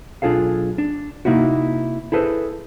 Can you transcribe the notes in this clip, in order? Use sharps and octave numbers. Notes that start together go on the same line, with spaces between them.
B1 D4 F4 G#4 A4 F5
D4
C3 A#3 D#4 E4 F#4
E4 G#4 A4 B4 C5